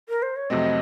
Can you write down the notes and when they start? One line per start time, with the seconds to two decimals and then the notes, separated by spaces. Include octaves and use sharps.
0.09 A#4
0.22 C5
0.36 C#5
0.50 F2 C3 F#3 A3 C4 D#5